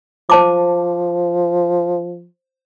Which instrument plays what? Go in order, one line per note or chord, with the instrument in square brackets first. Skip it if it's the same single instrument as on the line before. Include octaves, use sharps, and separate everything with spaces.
[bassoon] F3 [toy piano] C5 A5 D6